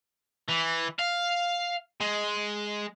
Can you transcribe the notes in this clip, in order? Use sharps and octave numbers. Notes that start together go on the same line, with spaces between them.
E3
F5
G#3